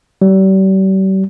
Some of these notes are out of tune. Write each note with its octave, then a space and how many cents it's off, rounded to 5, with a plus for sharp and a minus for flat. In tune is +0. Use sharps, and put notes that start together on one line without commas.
G3 -40